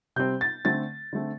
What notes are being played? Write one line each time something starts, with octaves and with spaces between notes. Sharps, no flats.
C3 G3 C4 G6
A6
D3 A3 C4 A6
D3 A3 C4